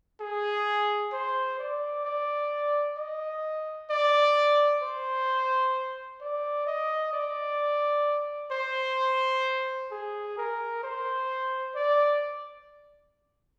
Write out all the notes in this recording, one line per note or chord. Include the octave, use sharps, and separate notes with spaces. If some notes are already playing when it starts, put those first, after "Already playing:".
G#4
C5
D5
D5
D#5
D5
C5
D5
D#5
D5
C5
G#4
A#4
C5
D5